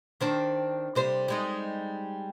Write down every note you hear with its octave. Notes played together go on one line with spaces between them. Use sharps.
D#3 C4 D4
C3 G3 C5
G3 G#3 D#4